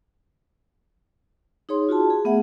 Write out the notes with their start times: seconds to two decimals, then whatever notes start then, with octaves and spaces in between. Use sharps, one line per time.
1.69 D#4 G#4 C#5 C6
1.89 F4 F#4 G#4 A5
2.10 G#4
2.25 A3 B3 E5 F#5